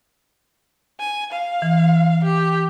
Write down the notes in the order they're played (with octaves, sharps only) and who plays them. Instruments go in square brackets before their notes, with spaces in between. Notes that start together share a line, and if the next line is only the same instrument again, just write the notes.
[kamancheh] G#5
F5
[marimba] E3
[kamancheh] G4